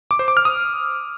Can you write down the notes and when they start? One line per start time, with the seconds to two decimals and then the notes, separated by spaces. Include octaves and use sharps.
0.11 D6
0.19 C5
0.28 D6
0.37 F6
0.45 D#6